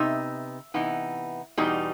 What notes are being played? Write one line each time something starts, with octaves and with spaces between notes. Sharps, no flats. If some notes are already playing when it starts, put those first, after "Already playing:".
Already playing: C3 B3 D#4 E5
C3 E3 B3 D#4
E2 B2 G3 D#4